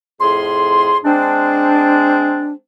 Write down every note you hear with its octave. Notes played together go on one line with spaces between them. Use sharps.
F2 A2 G#4 C6
G#3 C4 D4